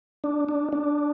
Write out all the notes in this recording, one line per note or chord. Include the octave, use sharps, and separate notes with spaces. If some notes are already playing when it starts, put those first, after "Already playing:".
D4
D4
D4